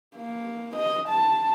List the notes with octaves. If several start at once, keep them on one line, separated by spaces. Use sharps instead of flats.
A#3
D#5
A5